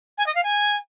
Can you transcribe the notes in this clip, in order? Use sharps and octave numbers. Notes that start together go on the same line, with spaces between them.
G#5
D#5
F5
G#5